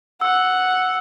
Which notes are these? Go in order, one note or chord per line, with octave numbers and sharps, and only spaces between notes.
F#5 E6